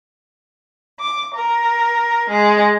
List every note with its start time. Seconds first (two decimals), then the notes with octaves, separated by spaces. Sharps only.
0.99 D6
1.33 A#4
2.29 G#3